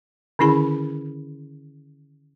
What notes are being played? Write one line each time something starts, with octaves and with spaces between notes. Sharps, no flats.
D3 D#3 C#4 E4 G#4 B5